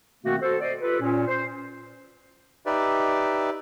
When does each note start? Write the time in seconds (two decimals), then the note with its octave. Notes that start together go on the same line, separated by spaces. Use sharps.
0.24 B2 D#3 A3 A#3 C4 F#4
0.42 F#4 A4 C5
0.61 C5 D5 D#5
0.80 F4 G4 A4 B4
1.00 A#2 C#4
1.27 C5
2.66 D#4 G4 B4 D5 E5